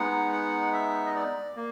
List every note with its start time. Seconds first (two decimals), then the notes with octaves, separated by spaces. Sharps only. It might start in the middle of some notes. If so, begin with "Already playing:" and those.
Already playing: G#3 B3 D#4 F#5
0.33 F#5
0.73 E5
1.06 D#5
1.15 D5
1.56 A#3